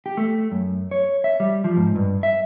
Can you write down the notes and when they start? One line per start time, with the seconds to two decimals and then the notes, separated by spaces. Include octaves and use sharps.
0.06 G4
0.17 A3
0.52 F#2
0.91 C#5
1.24 E5
1.40 G3
1.64 F3
1.77 G#2
1.96 G2
2.23 E5